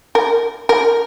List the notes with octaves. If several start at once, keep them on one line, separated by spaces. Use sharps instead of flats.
A#4
A#4